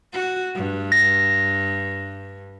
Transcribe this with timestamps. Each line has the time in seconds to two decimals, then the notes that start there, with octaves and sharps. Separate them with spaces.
0.13 F#4
0.55 G2
0.92 A#6